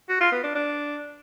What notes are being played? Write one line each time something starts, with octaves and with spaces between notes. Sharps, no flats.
F#4
F4
B3
D4
D4